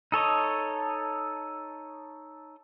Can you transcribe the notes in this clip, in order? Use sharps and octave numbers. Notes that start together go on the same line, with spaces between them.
D#4 A4 C#5 D#5